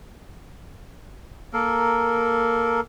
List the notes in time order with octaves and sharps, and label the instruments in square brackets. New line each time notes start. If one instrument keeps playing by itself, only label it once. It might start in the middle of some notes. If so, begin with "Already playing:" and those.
[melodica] A#3 A4 A#4